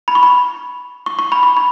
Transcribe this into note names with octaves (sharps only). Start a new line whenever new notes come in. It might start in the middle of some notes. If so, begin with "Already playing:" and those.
B5
C#6
B5
C#6
C#6
B5
C#6
B5